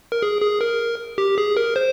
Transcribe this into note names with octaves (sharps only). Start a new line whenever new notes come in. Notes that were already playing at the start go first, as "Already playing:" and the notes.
A#4
G#4
G#4
A#4
G4
G#4
A#4
C5